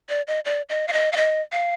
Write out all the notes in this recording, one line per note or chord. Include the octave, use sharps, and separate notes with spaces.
D5
D#5
D5
D#5
F5
D#5
F5
D#5
F5